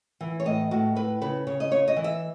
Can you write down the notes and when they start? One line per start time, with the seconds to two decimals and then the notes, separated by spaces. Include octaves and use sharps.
0.21 E3
0.40 C#5
0.45 A2 D#5
0.71 A2 F#4
0.95 A2 B4
1.21 C#3 B4
1.47 C#3 C#5
1.60 D#5
1.71 C#3 C#5
1.88 D#5
1.96 E3
2.04 E5